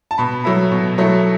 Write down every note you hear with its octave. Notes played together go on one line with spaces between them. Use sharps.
A5
B2 B5
F#3 A3 E4 B5
B2
F#3 A3 E4